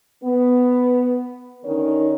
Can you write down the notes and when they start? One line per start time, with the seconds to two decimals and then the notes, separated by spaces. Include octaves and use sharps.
0.24 B3
1.64 D3 D#3 C#4 D#4 A#4 C#5